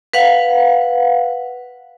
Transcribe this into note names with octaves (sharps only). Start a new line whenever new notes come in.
B4 F5 F#5